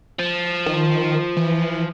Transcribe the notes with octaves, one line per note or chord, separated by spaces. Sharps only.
F3
D#3
E3